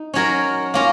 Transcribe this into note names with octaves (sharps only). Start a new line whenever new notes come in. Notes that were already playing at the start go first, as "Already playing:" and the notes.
Already playing: D#4
F#3 C#4 F#4 A#4 C#5
A#3 C#4 F4 A#4